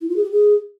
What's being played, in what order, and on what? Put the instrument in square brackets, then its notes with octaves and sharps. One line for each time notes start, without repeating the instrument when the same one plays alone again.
[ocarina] E4
F4
G#4
G4
G#4